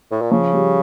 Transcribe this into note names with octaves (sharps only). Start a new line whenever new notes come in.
A2
A#2
C#3 F3
G3